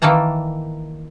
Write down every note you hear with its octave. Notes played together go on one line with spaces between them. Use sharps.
D#3 E3 A#3 A5 A#5